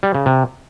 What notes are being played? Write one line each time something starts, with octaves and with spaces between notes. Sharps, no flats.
G3
C#3
C3